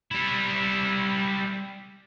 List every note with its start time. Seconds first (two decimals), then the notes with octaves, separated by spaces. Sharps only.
0.11 G3 E4